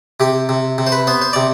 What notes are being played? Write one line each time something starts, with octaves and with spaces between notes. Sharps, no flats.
C3 G4
C3
C3
C5
B4
B3 C5
C5
C3 D5